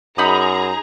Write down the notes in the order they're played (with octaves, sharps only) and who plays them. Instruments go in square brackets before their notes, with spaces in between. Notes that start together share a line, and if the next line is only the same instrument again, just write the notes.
[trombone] F#2 [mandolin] D#4 B5 D#6 [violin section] G#4 A#5